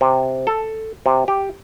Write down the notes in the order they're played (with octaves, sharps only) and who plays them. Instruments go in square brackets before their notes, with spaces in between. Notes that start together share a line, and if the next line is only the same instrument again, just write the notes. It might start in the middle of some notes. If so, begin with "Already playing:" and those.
[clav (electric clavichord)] C3
A4
C3
G4